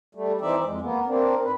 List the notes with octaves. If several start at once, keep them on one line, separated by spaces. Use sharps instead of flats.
G3 A3
E3 C4 D#4 D5 E5
F2 G#3
A#3 B3
A#3 C4 D4
G#2 B4